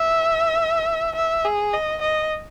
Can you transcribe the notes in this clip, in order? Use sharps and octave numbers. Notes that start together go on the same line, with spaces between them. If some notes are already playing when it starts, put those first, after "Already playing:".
Already playing: E5
E5
G#4
D#5
D#5